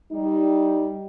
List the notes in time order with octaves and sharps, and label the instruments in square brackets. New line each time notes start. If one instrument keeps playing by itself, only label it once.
[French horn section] G3 D#4